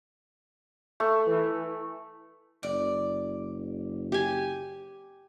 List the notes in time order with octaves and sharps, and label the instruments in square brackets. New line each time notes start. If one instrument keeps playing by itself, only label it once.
[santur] A3
[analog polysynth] E3
[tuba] F#1 [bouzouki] D5
[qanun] G4 G#5